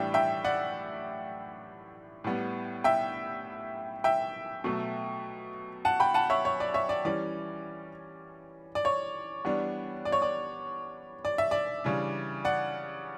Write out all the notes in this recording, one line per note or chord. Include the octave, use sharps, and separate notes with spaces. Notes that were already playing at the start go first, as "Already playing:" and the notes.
Already playing: A2 E3 G3 D4 E5 G5
E5 G5
D5 F#5
A2 G3 B3
E5 G5
E5 G5
B2 F#3 A3
F#5 A5
G5 B5
F#5 A5
C#5 E5
C#5
D5
C#5 E5
D5
E3 G3 C#4 D5
D5
C#5
E3 G3 B3 D4
D5
C#5
D5
D5
E5
D5
C#3 E3 G3 D4
D5 F#5